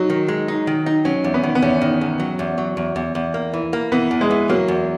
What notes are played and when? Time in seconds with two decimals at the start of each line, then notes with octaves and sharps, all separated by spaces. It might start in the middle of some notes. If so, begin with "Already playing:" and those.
Already playing: F#3 D#4
0.10 D#3
0.28 G#3
0.48 D#4
0.67 D#3
0.86 D#4
1.05 F#3 C#4
1.24 E2
1.34 B3
1.43 D#3
1.55 B3
1.62 E2 C#4
1.81 D#3
2.01 E2
2.20 F#3
2.39 E2
2.58 F#3
2.77 E2
2.96 E2
3.15 E2
3.34 A#3
3.53 E3
3.73 A#3
3.92 E3 B3
4.11 E2
4.21 G#3
4.31 E3
4.49 F#3 A#3
4.68 E2